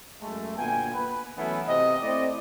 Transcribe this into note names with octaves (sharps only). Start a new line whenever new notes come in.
F#2 G#3 A3
A#2 D3 B3 G5 G#5
B4
E3 F#3 A3 B3 C#4 E4
C3 C4 G4 D#5
A3 C4 E4 D5 D#5